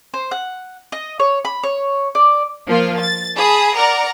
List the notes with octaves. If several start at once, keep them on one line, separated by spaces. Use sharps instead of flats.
C5
F#5
D#5
C#5
B5
C#5
D5
F3 A#3 F4
A6
G#4 A5 B5 D#6
A#4 D5 F#5 A#5